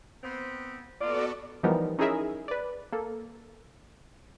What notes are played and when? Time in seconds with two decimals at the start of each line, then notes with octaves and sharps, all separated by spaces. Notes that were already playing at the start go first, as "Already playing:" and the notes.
0.23 B3 C4
1.01 A#3 B3 F4 F#4 A4 D5
1.63 E3 F3 G3 B3 D#4 A#4
1.99 C#4 D#4 E4 G#4 A#4 E5
2.48 B4 D5
2.92 A#3 A4